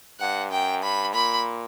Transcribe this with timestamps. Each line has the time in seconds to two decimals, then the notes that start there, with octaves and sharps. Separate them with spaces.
0.20 G2 F#5
0.51 F#2 G5
0.82 G2 B5
1.14 A#2 B5